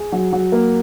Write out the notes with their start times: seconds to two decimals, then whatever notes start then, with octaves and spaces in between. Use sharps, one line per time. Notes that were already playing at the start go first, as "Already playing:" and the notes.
Already playing: G#4
0.12 F#3
0.33 F#3
0.52 A#3